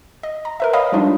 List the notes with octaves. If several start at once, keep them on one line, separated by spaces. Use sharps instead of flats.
D#5
A#5
A#4 B4 E5
C#5 D#5 F5 B5 D#6
F3 G3 G#3 D4 D#4 F4